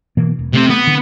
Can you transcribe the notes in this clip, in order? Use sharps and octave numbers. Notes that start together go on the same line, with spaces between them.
B2 E3 A#3
E1
C3 A3 C4
B3
D3